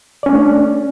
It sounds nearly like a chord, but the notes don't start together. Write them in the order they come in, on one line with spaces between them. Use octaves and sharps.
D5 C#4 D4 A3